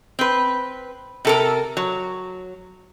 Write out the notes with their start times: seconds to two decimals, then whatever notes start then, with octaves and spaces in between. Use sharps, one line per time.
0.19 C4 B4
1.25 C3 A4 A#4
1.77 F#3